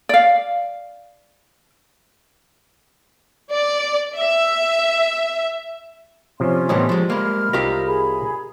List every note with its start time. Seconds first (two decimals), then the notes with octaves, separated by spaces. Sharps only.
0.09 D5 F5
3.50 D5
4.17 E5
6.40 C3 F3 C#4 D4 C6
6.69 A2 E3 G3 B3 C5 D#5
6.89 F3 G#3
7.10 G#3 A#3 B5 F6
7.53 C2 F4 G4 A#4 D#5
7.85 G#4 B5